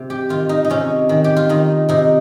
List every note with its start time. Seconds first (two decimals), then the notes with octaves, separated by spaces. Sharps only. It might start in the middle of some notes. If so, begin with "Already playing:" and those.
Already playing: C3
0.10 G4
0.29 D#3 F4
0.49 D#4
0.65 D#4
0.70 C3 C#4
1.09 D#3
1.24 G4
1.36 F4
1.49 D#3 D#4
1.89 C3 D#4